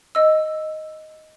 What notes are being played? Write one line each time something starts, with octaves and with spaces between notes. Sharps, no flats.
D#5 E6